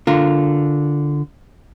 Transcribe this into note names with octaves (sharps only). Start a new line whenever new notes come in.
D3 F4 A#4